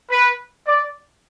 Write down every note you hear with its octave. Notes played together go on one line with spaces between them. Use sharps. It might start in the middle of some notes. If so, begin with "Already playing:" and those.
B4
D5